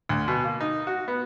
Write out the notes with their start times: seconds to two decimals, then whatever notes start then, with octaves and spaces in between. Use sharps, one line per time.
0.09 D2
0.28 B2
0.44 A#3
0.60 D#4
0.87 F#4
1.08 B3